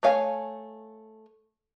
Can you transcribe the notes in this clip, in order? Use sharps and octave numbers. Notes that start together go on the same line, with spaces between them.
A3 C#5 F5 G#5